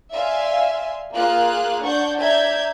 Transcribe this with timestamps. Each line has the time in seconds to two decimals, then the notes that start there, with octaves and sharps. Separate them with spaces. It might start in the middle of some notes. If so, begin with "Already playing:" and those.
0.12 D5 E5 F5 G#5 C6
1.13 A#3 F4 G#4 F5 F#6
1.83 D4 D5 F#5 C#6 G6
2.19 D5 E5 A#5 G6 G#6